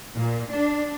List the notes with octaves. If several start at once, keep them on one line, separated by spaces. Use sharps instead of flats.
A#2
D4